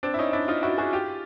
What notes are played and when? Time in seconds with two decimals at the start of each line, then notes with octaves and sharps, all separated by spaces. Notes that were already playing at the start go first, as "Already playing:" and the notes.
0.03 C4 D4
0.14 E4
0.19 C#4 D#4
0.33 D4 E4
0.48 D#4 F4
0.63 E4 F#4
0.78 F#4 G#4
0.93 F4 G4